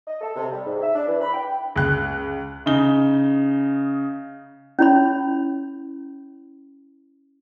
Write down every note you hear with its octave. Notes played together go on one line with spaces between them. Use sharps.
D#5
A4
C3
G3
G#2
E5
D4
E3
B5
G5
C#2 F#6
C#3 D#4 G7
C#4 E4 C#5 B5